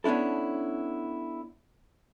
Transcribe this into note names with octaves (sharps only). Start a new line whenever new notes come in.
B3 C#4 D4 E4 A4